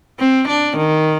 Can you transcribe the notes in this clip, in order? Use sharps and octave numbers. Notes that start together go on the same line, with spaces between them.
C4
D4
D#3